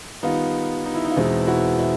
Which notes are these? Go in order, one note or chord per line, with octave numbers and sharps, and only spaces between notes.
D#3 G3 B3 D#4 F4
D#4
E4
D#4
F4
E2 B2 G#3 C4 D#4 E4
E4 F#4
E4